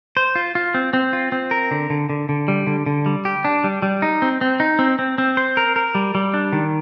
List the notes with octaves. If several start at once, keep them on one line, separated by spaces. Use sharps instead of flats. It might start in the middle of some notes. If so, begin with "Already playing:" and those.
C5
F4
F4
C4
C4
F4
C4
A#4
D3
D3
D3
D3
G3
D3
D3
G3
G4
D4
G3
G3
D#4
C4
C4
D#4
C4
C4
C4
C5
A#4
A#4
G3
G3
D4
D#3